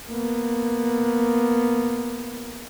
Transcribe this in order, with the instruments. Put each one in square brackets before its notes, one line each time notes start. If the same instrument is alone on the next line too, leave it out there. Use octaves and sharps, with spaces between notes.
[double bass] A#3 B3